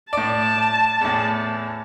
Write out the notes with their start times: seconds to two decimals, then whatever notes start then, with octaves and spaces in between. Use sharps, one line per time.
0.13 A2 D5 A5
1.01 E2 A2